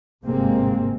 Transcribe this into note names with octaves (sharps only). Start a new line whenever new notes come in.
G1 G#2 C3 G#3 A#3 C4